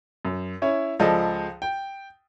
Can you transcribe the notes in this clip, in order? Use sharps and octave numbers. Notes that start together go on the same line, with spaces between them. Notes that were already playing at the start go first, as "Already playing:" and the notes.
F#2
C#4 E4 C#5
C#2 F3 G#3 A4 D5 D#5
G5